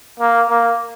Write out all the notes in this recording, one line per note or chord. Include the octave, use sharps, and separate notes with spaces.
A#3
A#3